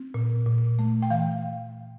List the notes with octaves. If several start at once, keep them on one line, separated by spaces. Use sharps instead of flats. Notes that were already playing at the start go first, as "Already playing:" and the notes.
Already playing: C4
A#2
A#2
A3
G5
E3 F5